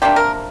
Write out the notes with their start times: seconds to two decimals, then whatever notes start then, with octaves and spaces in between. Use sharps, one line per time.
0.02 C3 A#3 D4 G4
0.16 A#4